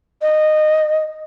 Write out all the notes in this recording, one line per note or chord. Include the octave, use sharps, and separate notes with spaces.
D#5